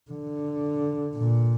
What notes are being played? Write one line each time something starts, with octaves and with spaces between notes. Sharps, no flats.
D3
A#2